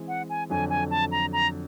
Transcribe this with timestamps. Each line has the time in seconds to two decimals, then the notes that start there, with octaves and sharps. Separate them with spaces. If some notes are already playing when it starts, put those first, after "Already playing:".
Already playing: E3 G#3 C4
0.08 F#5
0.30 G#5
0.50 F2 D3 F#3 G#5
0.70 G#5
0.91 A5
1.12 A#5
1.33 A#5